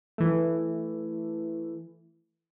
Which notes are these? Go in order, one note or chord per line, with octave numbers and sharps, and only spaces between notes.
E3 A3